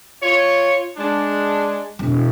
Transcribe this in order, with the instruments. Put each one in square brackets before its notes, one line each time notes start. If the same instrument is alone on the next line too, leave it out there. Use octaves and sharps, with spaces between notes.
[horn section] F4 C#5
G#3 D4
[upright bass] E1 B2